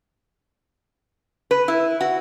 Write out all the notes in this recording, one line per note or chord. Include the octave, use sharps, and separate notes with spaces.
B4
E4
F#4